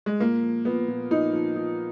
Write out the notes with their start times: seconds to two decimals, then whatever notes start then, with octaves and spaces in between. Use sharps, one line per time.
0.06 G#3
0.20 A#2 A#3
0.43 F3
0.65 F3 B3
0.88 A#2
1.11 F3 D#4
1.33 F3
1.56 F3